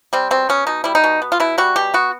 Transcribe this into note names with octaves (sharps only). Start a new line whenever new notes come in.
G3 C4
B2 C4
B3 C#4
B2 D#4
G3 E4
D#4
B2
B3
F4
B2 E4
G3 F#4
B2 G4
B3 F#4